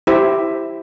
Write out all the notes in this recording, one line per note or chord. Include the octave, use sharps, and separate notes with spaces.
E4 G4 C5 E5